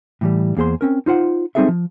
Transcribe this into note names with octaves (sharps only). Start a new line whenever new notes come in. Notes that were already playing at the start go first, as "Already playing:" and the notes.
A2 E3 G3
E2 A#3 G#4 C5 C6
C4 C#4 A#4
D#4 F4 C5 F#5
G3 C4 D#4 G#4 A4 E5
F3